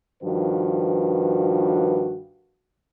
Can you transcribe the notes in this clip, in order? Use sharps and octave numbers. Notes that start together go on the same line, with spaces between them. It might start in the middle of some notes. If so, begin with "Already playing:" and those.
G2 D#3 F3 F#4 B4